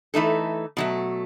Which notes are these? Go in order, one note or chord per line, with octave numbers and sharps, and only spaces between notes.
E3 A3 D#4 A4
B2 F#3 A3